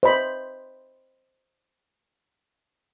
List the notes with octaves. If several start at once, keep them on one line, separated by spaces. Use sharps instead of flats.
C5 D#5 B5